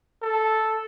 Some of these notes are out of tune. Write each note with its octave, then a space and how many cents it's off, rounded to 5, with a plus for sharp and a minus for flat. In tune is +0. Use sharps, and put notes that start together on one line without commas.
A4 -5